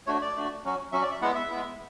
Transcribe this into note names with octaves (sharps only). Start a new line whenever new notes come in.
A3 D4 F#4 C#5
D5
A3 D4 F#4
F#3 C#4 F#4
F#3 C#4 F#4 E5
D5
E5
G#3 B3 E4 F#5
E5
G#3 B3 E4